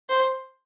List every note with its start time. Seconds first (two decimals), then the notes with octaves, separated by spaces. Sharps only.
0.09 C5